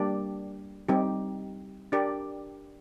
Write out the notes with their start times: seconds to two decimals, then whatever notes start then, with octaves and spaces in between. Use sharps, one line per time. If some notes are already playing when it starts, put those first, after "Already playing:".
Already playing: G3 A#3 D4 G4 D5
0.89 G3 C4 D#4 G4
1.92 D4 G4 A#4 D5